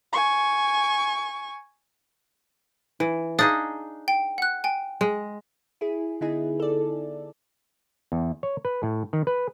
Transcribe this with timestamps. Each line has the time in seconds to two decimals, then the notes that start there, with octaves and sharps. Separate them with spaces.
0.13 G#5 C#6
3.00 E3
3.39 D4 D#4 G#4 F5 D#6 A6
4.08 G5
4.38 F#5 F#6
4.64 G5 G#5
5.01 G#3
5.81 E4 G#4
6.21 D3 B3 D#4 E4 G#4
6.60 A4 D5
8.12 E2
8.43 C#5
8.65 B4
8.83 A2
9.13 D#3
9.27 B4